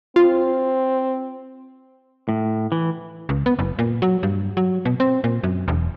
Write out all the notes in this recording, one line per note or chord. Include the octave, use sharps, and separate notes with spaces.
C4 F4
A2
E3
C#2
B3
F#1
A#2
F#3
G2
F#3
B2
C4
A#2
F#2
E1